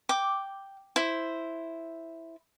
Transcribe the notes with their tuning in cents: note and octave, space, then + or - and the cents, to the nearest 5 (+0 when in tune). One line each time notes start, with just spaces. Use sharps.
G5 +0 D6 +0
E4 +0 C5 +0